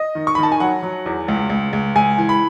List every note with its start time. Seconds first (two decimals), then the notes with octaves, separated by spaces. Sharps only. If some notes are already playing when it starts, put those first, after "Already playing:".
Already playing: D#5
0.15 D#3
0.27 C#6
0.35 D#3 B5
0.43 A5
0.52 G#5
0.60 F#3 F#5
0.83 F#3
1.06 E2
1.28 C#2
1.50 C#2
1.73 C#2
1.96 C#2 G#5
2.18 E3
2.29 B5